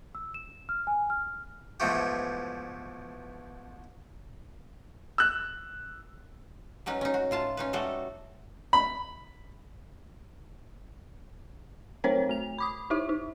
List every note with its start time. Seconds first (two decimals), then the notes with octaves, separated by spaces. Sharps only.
0.15 E6
0.34 E7
0.69 F6
0.87 G#5
1.10 F6
1.80 G#2 B2 E3 F3 A3 G4
5.18 E6 F#6
6.86 F#3 C#4 D#4 B4
7.01 C#4 D#4
7.14 F#4
7.31 A2 F4 A5
7.57 C#4 D#4 B4
7.73 G3 A3 F#4 A4
8.73 B5
12.04 F#3 A3 C4 A#4 C5 C#5
12.29 A3 F7
12.58 B5 D6 D#6
12.90 D#4 E4 G4 E5
13.09 D#4